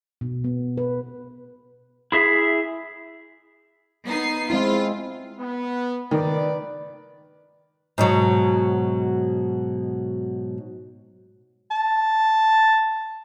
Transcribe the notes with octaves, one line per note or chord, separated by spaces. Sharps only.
B2
B3
B4
E4 G#4 E5
B3 D#4 C7
G#3 C4 E4 F4
B3
D#3 B4 D5
G#2 B2 F#3
A5